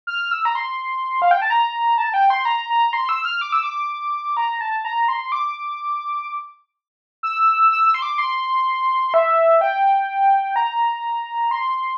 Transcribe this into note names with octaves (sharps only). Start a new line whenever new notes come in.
F6
E6
A#5
C6
F5
G5
A5
A#5
A5
G5
C6
A#5
A#5
C6
E6
F6
D6
E6
D6
A#5
A5
A#5
C6
D6
E6
E6
E6
C6
D6
C6
E5
G5
A#5
C6